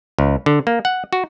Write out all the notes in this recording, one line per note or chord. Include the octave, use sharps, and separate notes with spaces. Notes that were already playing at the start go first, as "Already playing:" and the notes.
C#2
D3
A#3
F#5
F#4